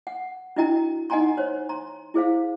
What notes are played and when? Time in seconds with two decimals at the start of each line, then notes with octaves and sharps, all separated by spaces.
0.07 F#5
0.56 D4 E4 F#4 D#5 G5 A#5
1.10 D#4 D#5 F#5 G#5 A#5 C6
1.37 C5 C#5
1.69 A#5 C6
2.14 E4 G#4 C5 F5